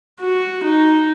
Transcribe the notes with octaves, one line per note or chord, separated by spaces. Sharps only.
F#4
D#4